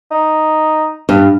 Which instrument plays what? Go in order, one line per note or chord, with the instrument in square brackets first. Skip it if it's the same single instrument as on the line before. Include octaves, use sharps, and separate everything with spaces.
[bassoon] D#4
[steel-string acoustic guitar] G2